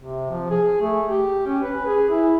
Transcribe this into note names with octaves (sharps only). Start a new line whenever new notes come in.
C3
F3
G#4
A3
G4
C#4
B4
G#4
E4